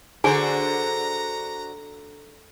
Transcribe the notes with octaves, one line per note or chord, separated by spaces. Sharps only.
D3 D4 F#4 G#4 C5 G#5 A#5